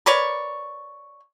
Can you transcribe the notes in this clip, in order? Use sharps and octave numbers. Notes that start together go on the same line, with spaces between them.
A#4 B4 C#5 D5